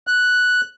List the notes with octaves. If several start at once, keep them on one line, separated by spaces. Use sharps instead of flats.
F#6